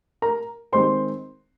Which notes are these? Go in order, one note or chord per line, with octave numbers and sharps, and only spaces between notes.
A#4 A#5
D#3 G#3 C4 C5 C6